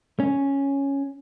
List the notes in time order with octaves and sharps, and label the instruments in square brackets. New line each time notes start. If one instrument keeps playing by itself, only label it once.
[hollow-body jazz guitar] C#4